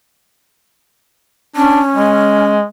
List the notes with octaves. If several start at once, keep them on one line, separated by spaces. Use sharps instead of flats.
C#4 D4
G#3